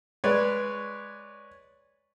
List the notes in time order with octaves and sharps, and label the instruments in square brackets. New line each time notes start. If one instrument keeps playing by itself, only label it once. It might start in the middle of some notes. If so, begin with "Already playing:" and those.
[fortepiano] G#3 B4 C#5 D5